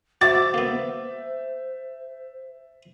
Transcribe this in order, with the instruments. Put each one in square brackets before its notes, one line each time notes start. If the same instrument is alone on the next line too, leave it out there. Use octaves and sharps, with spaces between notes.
[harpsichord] F#4 [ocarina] C5 [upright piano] E5 A6 [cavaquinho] D6
[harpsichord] A#3 B3